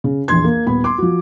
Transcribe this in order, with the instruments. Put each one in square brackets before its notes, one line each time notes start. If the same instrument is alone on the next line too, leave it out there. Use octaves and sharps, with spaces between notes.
[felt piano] C#3
A#1 E2 C6 G#6
A#3
D#1 B3 B5
C6 D6
F3 F#4